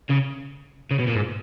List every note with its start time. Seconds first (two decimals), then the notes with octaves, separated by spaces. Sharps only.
0.10 C#3
0.91 C#3
0.99 B2
1.07 A#2
1.15 G#2